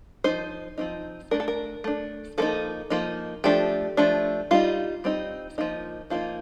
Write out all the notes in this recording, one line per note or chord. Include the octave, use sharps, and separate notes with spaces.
F3 C4 D#4 C5
F3 C4 D#4
A3 D4 A#4
A4
A#4
A3 D4
F3 A#3 D#4 A4
F3 A#3 D#4
F3 A3 D4 G4
F3 A3 D4
G3 C4 D#4 F4
G3 C4 D#4
F3 A#3 D#4
F3 A#3 D#4 F4